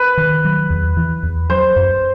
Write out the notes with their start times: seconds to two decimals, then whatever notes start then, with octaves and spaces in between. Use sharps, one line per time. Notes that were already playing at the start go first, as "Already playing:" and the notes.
Already playing: B4
0.17 D#3
0.45 F#3
0.70 E2
0.97 E3
1.23 E2
1.50 F#3 C5
1.76 F#2